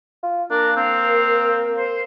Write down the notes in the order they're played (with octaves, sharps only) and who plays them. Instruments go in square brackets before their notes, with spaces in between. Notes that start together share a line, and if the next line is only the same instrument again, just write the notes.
[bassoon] F4
[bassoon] A#3 [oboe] D4 [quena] A#4
[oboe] C4 [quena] F5
[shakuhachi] A#4
[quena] C5